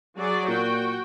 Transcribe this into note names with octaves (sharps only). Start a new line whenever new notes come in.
F#3 G#4 D5
A#2 F#4 G5